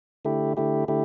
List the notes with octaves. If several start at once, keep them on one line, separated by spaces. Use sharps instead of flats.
D3 A3 E4 G4
D3 A3 E4 G4
D3 A3 E4 G4